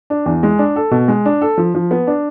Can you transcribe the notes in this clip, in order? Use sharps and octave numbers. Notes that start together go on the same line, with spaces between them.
D4
E2
G#3
D4
A4
B2
G#3
D4
A4
F3
F3
B3
D4